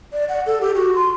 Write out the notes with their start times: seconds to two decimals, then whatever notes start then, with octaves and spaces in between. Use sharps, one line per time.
0.13 D5
0.29 F#5
0.46 A4
0.61 G4
0.75 F#4
0.95 C6